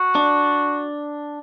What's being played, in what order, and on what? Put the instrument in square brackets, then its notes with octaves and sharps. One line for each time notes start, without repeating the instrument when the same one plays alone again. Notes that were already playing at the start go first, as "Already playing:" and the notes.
Already playing: [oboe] F#4
[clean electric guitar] D4